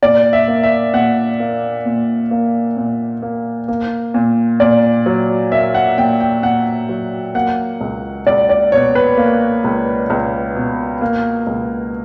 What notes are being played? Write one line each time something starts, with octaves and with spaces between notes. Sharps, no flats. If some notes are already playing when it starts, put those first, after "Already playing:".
A#2 D5
E5
A#3
E5
A#2 F#5
A#3
A#2
A#3
A#2
A#3
A#3
A#2
A#2 D5
F#3
A#3 E5
F#5
A#2 G5
G5
A#2 F#5
F#3
A#3 F#5
C#2
C#2 D5
D5
B2 C#5
B4
A#3
C#2
C#2
B2
A#3
C#2